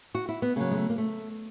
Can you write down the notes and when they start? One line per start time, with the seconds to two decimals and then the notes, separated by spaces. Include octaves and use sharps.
0.15 F#4
0.29 E4
0.42 B3
0.56 C#3 F#3 A#3
0.71 G#3
0.77 A3
0.90 A#3
0.98 A3